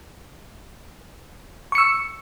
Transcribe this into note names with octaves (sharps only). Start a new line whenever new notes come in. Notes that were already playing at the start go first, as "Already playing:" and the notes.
C#6 E6 C#7